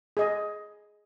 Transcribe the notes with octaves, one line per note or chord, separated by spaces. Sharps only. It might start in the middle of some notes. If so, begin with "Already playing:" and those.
G#4 D#5